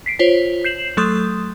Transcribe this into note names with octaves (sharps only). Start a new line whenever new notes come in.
B6 C7 D7
F4 C5 C#5 B6
G6 C7 E7 F#7
F#3 A3 A4 C6 D#6 G6